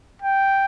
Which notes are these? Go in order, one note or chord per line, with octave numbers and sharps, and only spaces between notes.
G5